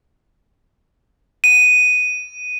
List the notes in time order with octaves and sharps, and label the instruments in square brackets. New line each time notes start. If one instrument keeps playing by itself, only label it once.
[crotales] D#7